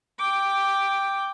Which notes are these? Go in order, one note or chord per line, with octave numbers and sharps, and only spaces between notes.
G5 D6